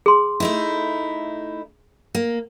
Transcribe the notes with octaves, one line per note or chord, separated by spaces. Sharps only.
G#4 C6
A3 D#4 E4
A#3